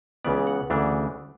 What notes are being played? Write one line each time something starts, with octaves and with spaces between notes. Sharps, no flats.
C#2 C#3 E3 B3 D5
F#5
D2 C#3 E3 A3 D4